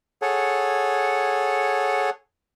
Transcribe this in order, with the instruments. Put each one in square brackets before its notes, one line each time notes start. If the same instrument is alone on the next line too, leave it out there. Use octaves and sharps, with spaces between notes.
[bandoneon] G#4 A4 C#5 F#5